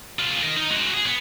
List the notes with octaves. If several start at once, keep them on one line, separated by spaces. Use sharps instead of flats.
G#3 F4
A#4 D#5
D#4
G#3 F#4
G#4
B3